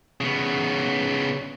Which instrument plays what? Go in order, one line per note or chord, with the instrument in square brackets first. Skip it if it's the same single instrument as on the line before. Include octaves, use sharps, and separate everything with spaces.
[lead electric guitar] C#3 B3